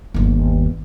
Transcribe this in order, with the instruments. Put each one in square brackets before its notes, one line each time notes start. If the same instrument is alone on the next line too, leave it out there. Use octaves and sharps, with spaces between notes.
[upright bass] G1 D#2